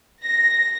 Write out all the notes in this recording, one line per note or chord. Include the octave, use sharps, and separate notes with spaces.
A#6